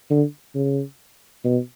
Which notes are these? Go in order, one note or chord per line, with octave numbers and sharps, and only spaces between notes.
D3
C#3
B2